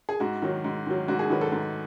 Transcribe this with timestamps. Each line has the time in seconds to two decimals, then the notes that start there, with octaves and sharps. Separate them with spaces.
0.09 G#4
0.20 G#2 F#4
0.42 D#3 F#3
0.64 G#2
0.87 D#3 F#3
1.08 G#2 F#4
1.19 G#4
1.30 D#3 F#3 B4
1.41 A4
1.52 G#2